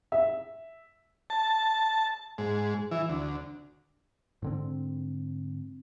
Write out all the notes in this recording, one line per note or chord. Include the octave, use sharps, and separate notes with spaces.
E5
A5
G#2
E3
D2
G#2 D3 C4